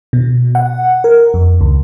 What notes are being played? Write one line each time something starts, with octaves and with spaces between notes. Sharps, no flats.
B2
F#5
A#4
F2
C#2